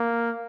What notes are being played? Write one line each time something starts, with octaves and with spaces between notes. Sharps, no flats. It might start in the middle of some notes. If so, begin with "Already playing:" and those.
Already playing: A#3